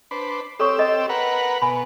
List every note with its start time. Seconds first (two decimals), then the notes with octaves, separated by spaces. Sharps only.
0.11 D4 B4 C5
0.59 C4 G4 A4 C#5 C#6 E6
0.78 A4 D#5
1.09 A#4 B4 F#5
1.62 B2 G#5 B5